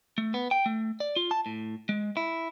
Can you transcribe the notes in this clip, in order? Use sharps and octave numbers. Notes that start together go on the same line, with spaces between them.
A3
B3
G5
A3
D5
F4
A5
A2
G#3
E4